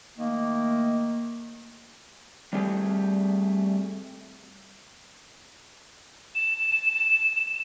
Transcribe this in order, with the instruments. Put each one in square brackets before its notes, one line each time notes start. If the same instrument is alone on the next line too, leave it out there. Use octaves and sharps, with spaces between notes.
[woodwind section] D#3 A3 A#3
[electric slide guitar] G3 A3 C4 G4 G#4
[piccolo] E7